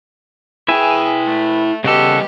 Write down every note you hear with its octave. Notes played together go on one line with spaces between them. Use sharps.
E4 G#4 B4 E5 G5 G#5
A3
C#3 G3 B3 F#4 G4 A4 D#5